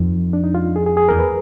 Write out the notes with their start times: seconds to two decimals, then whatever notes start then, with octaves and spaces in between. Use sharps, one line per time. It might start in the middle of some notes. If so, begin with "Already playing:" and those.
Already playing: F2 D#4
0.33 D4
0.43 D#4
0.55 F4
0.76 G#4
0.86 G#4
0.97 G#4
1.09 E2 A#4
1.19 B4